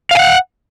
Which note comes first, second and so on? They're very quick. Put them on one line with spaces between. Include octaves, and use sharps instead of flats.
F5 G#5 F#5